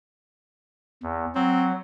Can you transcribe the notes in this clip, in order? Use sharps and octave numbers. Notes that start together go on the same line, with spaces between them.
E2
F#3 C4